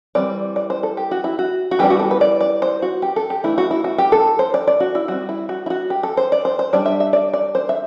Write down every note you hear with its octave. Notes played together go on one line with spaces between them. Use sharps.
E3 G3 C4 D5
D5
C5
A4
G4
F#4
E4
F#4
F#4
E3 G3 B3 D4 G4
F#4
A4
B4
D5
D5
C5
F#4
G4
A4
G4
E3 A3 D4 E4
F#4
E4
F#4
G4
A4
C5
D5
D5
F#4
E4
G3 C4 F#4
E4
F#4
E4
F#4
G4
A4
C5
D5
C5
C5
G3 D4 D5
E5
E5
D5
D5
C5
E5